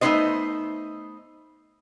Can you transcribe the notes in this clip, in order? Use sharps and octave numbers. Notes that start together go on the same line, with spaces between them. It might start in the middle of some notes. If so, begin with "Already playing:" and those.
A3 B3 C#4 D#4 C5 D#5